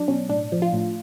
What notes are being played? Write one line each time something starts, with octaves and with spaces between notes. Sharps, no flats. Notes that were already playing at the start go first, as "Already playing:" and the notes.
Already playing: F#3 D4
B2 C#4
A2 D4
F3
F4
A2